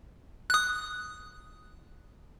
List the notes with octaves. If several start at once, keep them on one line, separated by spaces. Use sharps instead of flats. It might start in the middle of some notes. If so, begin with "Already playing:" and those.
D#6 F#6